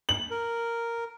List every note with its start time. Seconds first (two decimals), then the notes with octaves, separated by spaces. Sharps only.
0.09 F#7
0.31 A#4